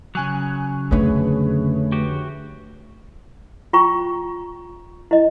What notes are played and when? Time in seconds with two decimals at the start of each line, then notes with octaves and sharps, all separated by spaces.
0.15 C#3 F#3 G#5 F#6
0.91 F2 D3 A3 G#4 B4 C#5
1.92 F#4 G4
3.73 F4 G5 A#5 C#6
5.11 E4 D#5